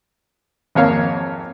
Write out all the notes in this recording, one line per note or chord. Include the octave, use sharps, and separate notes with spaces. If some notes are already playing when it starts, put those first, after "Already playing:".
G#1 F2 A#3 C#5 F5